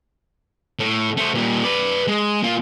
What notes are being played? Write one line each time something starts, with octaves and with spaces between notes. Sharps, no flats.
A2
A3 C5
A#2 G3
B4 D5
G#3
A#3 F4